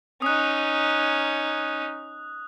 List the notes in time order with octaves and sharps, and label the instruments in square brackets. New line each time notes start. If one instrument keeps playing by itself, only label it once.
[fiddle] C#4 D#4 [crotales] D#6 F#6